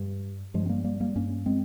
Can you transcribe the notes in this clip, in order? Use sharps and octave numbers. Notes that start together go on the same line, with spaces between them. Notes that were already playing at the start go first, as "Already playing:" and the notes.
Already playing: G2
G2 F3 G#3
C4
G3 A#3
G3 A#3
G3 A#3
G2 A#3 C#4
G#3 C4